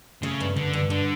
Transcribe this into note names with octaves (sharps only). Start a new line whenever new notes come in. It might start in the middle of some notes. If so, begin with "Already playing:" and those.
C#3 A3
G2
G2 D3
G2
G2 D3